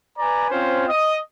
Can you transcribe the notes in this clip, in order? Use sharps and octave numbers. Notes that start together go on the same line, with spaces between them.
B4 D5 G#5 A#5
C4 C#4 F4 C5
D#5 D#6